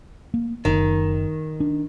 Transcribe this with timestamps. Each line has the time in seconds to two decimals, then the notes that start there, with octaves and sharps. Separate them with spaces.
0.34 A#3
0.65 F#1 D#3
1.60 D4